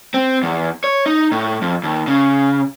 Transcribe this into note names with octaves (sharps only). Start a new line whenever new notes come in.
C4
E2
C#5
D#4
A2
F2
D#2
C#3